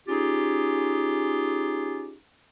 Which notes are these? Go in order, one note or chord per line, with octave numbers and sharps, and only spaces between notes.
C#4 D#4 F4 G4 G#4